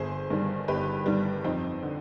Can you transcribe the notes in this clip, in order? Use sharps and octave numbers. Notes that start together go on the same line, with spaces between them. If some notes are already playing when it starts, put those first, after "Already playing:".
Already playing: G1 G#4 C5
G2 D#3 G3
G1 G4 B4
G2 D#3 G3
F2 C4 D#4
D3